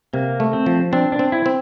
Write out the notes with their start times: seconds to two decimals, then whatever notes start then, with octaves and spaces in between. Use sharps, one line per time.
0.14 C3 A#3
0.40 A3
0.53 C4
0.66 F3
0.93 C4 D4
1.12 D4
1.19 C4
1.32 E4
1.46 C4